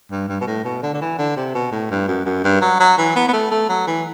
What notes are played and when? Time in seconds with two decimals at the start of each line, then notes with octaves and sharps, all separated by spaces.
0.11 G2
0.29 G2
0.41 B2
0.47 A2
0.65 B2
0.83 D3
0.94 D3
1.01 E3
1.19 D3
1.36 C3
1.55 B2
1.72 A2
1.91 G2
2.08 F#2
2.26 F#2
2.44 G2
2.61 F#3
2.80 F#3
2.98 E3
3.16 B3
3.28 B3
3.33 A3
3.51 A3
3.69 F#3
3.87 E3